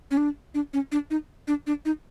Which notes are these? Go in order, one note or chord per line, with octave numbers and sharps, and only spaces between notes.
C#4
D4
D4
C#4
D4
D#4
D4
D4
D#4